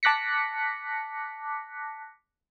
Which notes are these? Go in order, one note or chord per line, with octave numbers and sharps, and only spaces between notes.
A5 D6 F#6 A#6 B6 C#7